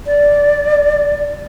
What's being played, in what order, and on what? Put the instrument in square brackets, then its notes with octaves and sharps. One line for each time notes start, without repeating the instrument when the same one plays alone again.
[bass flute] D5